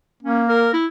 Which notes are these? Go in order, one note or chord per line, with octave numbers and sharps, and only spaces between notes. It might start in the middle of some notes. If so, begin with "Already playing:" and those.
A#3 C#4
A#4
E4